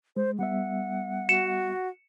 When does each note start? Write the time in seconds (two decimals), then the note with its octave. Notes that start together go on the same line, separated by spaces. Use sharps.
0.16 G#3 C5
0.39 G3 B3 E5 F#5
1.29 F#4 C#7 E7